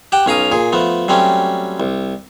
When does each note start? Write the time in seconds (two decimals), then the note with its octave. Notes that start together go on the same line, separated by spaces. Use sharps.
0.12 G4 F#5 G5 A5
0.26 B1 C#4 F5 A#5 D#6
0.52 A#2 G#4
0.72 F3 A3 B3
1.08 F#3 G3 A3 C4 C#4
1.80 C2